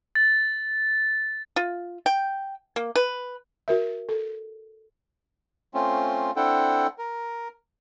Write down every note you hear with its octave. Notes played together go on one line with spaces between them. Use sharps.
A6
F4
G5
A#3
B4
F#4 A#4 E5
A4
A3 C4 C#4 F4
C4 D4 E4 A4 F#5 G5
A#4